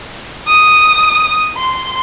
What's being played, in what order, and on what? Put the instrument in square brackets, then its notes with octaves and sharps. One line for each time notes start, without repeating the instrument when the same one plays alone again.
[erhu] D#6
C6